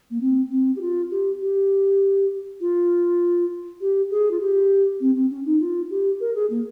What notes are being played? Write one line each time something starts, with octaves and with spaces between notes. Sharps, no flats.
A#3
C4
C4
G4
F4
G4
G4
F4
G4
G#4
F4
G4
C4
C4
C#4
D#4
F4
G4
A#4
G#4
A#3